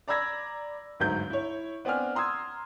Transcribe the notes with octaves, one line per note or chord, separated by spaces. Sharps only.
D5 A#5 B5 E6 G#6 A#6
G1 D2 G#2 F#3 G6
E4 C#5
B3 C4 D4 G#5 F6
A#5 C6 D#6 E6 G#6